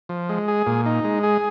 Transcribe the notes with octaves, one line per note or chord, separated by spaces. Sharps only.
F3
G#3
G#4
A#2
D#4
G#3
G#4